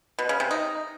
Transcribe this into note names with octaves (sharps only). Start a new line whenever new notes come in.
B2
C#3
C3
D#4